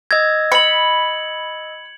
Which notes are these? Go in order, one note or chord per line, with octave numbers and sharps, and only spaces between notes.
D#5 E6 G#6 A#6
B5 C#7 F#7